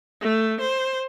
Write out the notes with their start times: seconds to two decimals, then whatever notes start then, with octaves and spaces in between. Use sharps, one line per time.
0.21 A3
0.61 C5